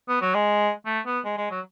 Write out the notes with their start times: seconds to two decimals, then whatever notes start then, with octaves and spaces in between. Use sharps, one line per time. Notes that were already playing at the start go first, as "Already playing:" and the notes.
0.09 B3
0.22 F#3
0.34 G#3
0.86 A3
1.06 B3
1.24 G#3
1.37 G#3
1.51 F#3